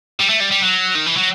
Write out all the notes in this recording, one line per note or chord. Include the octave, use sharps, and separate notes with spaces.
G3
A3
G3
G3
F#3
D#3
E3
F#3